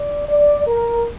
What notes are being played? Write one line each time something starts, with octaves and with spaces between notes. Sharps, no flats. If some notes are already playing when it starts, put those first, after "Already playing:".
Already playing: D5
D5
A#4